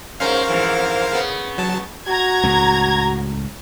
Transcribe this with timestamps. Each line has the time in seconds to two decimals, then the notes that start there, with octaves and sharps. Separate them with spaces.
0.20 G#2 C#4 A#4 C5 F5
0.49 F2 G#2 E3
1.12 C#3 B3
1.58 F#3 A5
2.08 F#4 A#5 G#6
2.43 C#2 A2